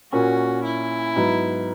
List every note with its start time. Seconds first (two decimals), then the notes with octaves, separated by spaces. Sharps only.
0.12 A#2 A#3 C#4 F#4
0.64 E4
1.16 G#2 F#3 B3